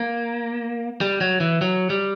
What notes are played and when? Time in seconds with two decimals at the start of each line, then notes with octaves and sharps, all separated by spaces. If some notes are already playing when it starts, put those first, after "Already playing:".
Already playing: A#3
1.01 G3
1.21 F#3
1.40 E3
1.61 F#3
1.90 G3